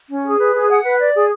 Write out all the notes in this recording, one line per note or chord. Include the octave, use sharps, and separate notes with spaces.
C#4
G#4
B4
G#4
F#5
B4
D5
G#4